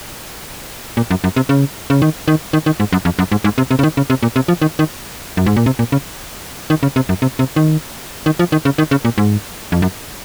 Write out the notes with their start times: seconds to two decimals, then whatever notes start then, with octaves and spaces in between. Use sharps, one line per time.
0.97 A#2
1.11 F#2
1.24 F#2
1.36 C3
1.49 C#3
1.90 C#3
2.02 D#3
2.28 D#3
2.53 D#3
2.66 D#3
2.80 G#2
2.93 F#2
3.05 F2
3.19 F#2
3.32 G#2
3.44 G#2
3.58 C3
3.71 C3
3.79 C#3
3.83 D#3
3.97 C#3
4.10 C3
4.23 A#2
4.36 C3
4.48 F3
4.62 D#3
4.79 D#3
5.37 F#2
5.46 G#2
5.57 A#2
5.66 C3
5.79 A#2
5.92 C#3
6.70 D#3
6.83 C#3
6.96 C3
7.09 F#2
7.22 C3
7.39 C3
7.56 D#3
8.26 D#3
8.39 F3
8.52 D#3
8.65 C#3
8.78 D#3
8.91 C#3
9.05 A#2
9.18 G#2
9.72 F2
9.82 F#2